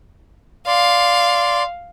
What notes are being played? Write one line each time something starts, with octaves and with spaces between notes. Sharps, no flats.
D5 F5 C6